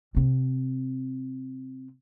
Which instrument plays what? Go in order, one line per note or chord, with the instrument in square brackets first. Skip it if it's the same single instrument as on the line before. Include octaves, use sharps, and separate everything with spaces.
[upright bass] C3 C4